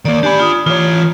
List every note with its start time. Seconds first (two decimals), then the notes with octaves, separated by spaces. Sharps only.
0.05 D#3 A#3 D5
0.23 D4 G4 D5 G#5 B5
0.40 F4 D#6
0.66 E3 F4 C#5